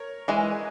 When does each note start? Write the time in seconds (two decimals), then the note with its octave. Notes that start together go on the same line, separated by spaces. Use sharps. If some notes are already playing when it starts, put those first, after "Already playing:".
Already playing: A#4 C#5
0.28 E3 G#3 G#4 B4